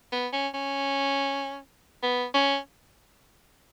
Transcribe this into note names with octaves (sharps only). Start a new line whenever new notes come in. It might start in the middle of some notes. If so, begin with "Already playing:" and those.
B3
C#4
C#4
B3
C#4